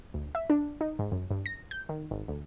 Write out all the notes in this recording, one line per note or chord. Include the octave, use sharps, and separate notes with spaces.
D2
E5
D4
D#4
G#2
F#2
G2
A#6
G6
D#3
G#1
D2